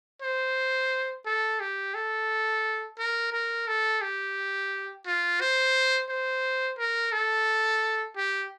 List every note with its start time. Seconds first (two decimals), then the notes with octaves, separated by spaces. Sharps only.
0.22 C5
1.26 A4
1.60 G4
1.95 A4
2.99 A#4
3.33 A#4
3.67 A4
4.02 G4
5.06 F4
5.41 C5
6.09 C5
6.78 A#4
7.12 A4
8.17 G4